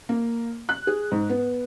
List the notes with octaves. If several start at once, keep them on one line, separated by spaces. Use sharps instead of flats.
A#3
F#6
G#4
G#2
B3